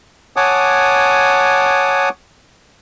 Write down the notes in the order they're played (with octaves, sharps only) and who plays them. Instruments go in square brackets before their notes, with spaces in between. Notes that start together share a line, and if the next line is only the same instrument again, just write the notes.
[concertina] C#5 F#5 G#5 A5 D6 D#6